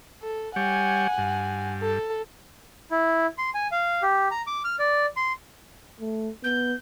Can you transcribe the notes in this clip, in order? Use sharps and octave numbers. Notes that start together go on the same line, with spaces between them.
A4
G3 G4 C#5 F#5 G#5
G2
A4
E4
C6
G#5
F5
G4
A#5
D6
F6
D5
C6
A3
B3 G6